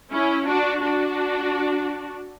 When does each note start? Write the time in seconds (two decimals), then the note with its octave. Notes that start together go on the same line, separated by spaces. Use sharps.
0.12 C#4 E4
0.47 D4 F#4
0.83 D4 F#4